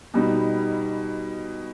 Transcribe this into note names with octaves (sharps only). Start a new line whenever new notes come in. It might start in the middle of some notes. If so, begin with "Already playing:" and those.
B2 G3 B3 D#4